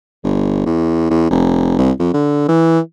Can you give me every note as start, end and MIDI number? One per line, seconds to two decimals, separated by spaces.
0.24 0.64 31
0.66 1.09 40
1.10 1.30 40
1.30 1.75 29
1.78 1.91 36
1.99 2.10 41
2.14 2.44 50
2.48 2.79 52